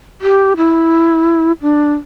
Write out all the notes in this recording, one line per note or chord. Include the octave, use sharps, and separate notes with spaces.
G4
E4
D4